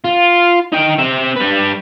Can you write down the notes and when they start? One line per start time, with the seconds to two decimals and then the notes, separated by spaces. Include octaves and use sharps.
0.04 F4
0.73 D#4 G5
0.99 C4 E5
1.36 G3 B4